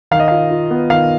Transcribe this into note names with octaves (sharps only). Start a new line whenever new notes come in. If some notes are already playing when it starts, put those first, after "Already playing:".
D#3 F5
D#5
F4 F5
F4
B3
D#3 F5